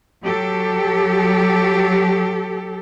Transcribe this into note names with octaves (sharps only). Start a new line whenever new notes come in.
F#3 G4 A4